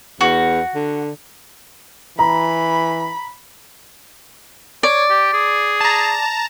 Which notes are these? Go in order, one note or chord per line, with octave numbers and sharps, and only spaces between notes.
E2 F#4
D3
E3 A#5 B5
C#5 D5
G4
G#4
A5 A#5